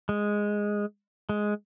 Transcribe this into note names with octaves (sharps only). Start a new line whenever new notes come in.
G#3
G#3